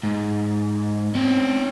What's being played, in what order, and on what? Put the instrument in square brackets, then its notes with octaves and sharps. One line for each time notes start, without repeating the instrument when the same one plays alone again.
[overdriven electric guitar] G#2
[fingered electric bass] C4 [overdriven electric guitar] C#4 C5